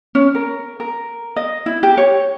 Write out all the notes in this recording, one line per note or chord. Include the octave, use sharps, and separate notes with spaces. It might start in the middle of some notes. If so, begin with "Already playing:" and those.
C#4
A#4
A#4
D#5
E4
G4
C#5